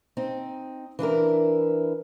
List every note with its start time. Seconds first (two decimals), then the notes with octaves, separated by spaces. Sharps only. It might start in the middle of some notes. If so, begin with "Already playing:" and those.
0.17 C4 D#4
0.99 E3 D4 E4 A#4